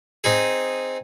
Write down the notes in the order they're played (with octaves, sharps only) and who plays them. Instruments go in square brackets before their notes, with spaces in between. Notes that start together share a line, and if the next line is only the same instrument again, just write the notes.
[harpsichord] C4 D#4 G#4